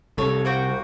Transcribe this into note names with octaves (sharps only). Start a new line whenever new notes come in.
C2 A4 C#5
A#3 F#4 C5 G5